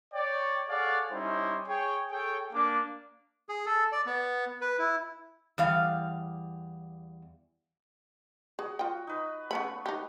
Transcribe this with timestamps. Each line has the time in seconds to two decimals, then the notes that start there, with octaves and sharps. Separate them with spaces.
0.14 C#5 D5 G5
0.68 G#4 A4 C#5 D5 F5 F#5
1.11 G3 C#4 D#4 E4 C5 G5
1.67 G#4 C#5 G5
2.10 G#4 A4 C#5 G5
2.53 A#3 D4 D6
3.49 G#4
3.66 A4
3.92 D5
4.06 B3
4.61 B4
4.79 E4
5.58 E2 G3 F5
8.59 F#4 G#4 D#6
8.79 F4 G5
9.07 D#4 B4
9.51 C#3 A3 B3 B4 B5 C#6
9.86 D#4 G4